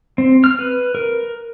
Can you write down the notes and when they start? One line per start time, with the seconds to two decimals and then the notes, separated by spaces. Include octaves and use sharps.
0.18 C4
0.44 F6
0.59 B4
0.95 A#4